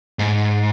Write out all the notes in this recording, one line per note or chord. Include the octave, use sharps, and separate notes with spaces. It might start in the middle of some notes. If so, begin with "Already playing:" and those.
G#2